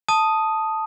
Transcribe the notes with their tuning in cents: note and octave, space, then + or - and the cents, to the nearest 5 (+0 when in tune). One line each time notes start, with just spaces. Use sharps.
A5 +0 D#6 +0